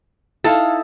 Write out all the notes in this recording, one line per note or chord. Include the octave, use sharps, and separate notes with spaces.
D#4 E4 A4 F5 A5